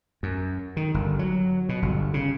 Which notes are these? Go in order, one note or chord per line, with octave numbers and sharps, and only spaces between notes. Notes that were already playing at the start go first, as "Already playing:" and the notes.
F#2
D#3
G1
F#3
B2
G1
C#3